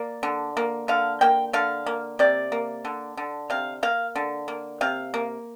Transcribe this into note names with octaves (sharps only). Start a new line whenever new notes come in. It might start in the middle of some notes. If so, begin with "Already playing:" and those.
Already playing: A#3 D5
D3
A#3
D3 F5
A#3 G5
D3 F5
A#3
C3 D5
A#3
D3
D3
C3 F5
A#3 F5
D3
A#3
C3 F5
A#3